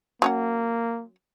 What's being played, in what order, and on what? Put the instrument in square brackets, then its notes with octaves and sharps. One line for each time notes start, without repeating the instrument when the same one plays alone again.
[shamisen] F#3 C#4 F#5 [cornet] A#3